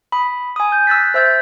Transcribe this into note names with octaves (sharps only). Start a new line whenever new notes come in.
B5 D#6
G#5 D#6
D#6 G6
E6 F#6 A6 B6
C5 E5 E6 G6 A6